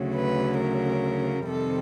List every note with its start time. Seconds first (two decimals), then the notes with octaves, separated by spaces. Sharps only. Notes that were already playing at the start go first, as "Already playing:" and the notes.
Already playing: D2 C#3 F#3
0.15 B4
0.59 A#4
1.48 F2 C3 D#3 G3 C4 A4